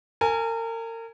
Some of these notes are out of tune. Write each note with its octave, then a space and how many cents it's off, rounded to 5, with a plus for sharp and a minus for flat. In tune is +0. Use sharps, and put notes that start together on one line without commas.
A#4 -35 G#5 +0